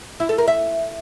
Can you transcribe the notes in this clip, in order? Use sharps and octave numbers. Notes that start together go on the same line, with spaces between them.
E4
A4
A#4
E5